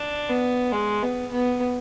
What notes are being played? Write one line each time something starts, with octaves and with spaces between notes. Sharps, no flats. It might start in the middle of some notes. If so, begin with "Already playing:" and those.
Already playing: D4
B3
G#3
B3
B3